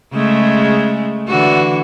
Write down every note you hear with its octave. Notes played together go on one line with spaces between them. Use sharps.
C#3 G#3 A3
D3 E3 F#4